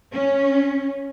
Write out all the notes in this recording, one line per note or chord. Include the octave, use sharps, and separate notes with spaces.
C#4